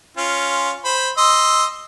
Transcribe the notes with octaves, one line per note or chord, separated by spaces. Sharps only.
C#4 F4
C5 B5
D#5 C6 E6